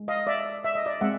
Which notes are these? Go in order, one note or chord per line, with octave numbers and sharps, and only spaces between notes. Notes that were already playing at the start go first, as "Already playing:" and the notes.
Already playing: G#3
D#5 F5
D5 E5
E5
D#5
D5 E5
G#3 C4 E5 F#5